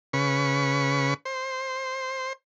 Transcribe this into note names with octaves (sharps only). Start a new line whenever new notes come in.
C#3 B4 C#6
C5